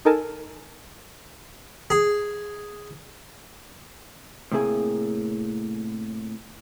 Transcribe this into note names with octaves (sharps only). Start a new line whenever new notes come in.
D#4 A4 A#4 G#5 A5
G#4
A2 C3 A#3 G#4 G#5